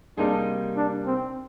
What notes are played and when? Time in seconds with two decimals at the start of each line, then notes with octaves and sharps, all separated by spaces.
0.17 C3 G3 A#3 D4 D#4 G#4
0.76 D4
1.06 C4